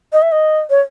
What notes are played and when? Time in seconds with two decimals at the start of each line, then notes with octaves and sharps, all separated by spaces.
0.13 D#5
0.22 E5
0.32 D#5
0.70 C#5